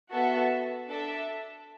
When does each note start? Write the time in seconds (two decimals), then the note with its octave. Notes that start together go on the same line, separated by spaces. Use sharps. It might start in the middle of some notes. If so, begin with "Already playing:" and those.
0.11 B3 F#4 A4 E5 A5
0.88 D4 A4 E5 A5